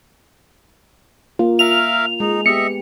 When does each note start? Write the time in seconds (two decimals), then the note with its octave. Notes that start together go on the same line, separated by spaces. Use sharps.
1.39 A#3 F4
1.59 A#4 E5 F5 F7
2.20 G#3 D#4
2.46 B3 G4 D#5 E5 C#7